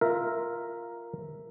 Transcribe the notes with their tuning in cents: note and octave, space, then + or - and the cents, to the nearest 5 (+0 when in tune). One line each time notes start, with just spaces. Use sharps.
F4 +0 A#4 +0 E5 +0